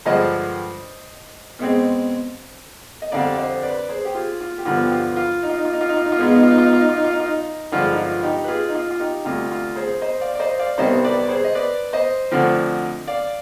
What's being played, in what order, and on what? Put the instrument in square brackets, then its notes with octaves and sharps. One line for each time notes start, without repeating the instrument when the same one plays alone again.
[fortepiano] G2 D3 F3 G#3 C5 D#5
B2 G#3 C4
D#5
F2 D3 G3 C4 D5 F5
C5 D#5
B4 D5
G#4 C5
G4
F4 G#4
F4
G4
G2 D3 F3 B3 F4
G4
F4
F4
D#4
F4
D#4
F4
D#4
F4
D#4
F4
D#4
F4
B2 G#3 B3 D#4
F4
D#4
F4
D#4
F4
D#4
F4
D#4
F4
D#4
F4
D#4
F4
D#4
G2 D3 F3 G#3 F4
D#4
F4
D#4 G4
B4
F4 G#4
D#4
F4
F4
D#4 G4
D2 C3 G3 F4
F4
G#4 C5
C5 D#5
D5 F5
D5
C5 D#5
D5 F5
C2 C3 D#3 G3 B3 C5 D#5
B4 D5
G#4 C5
D#5
B4 D5
C5 D#5
D2 D3 F3 C4
D5 F5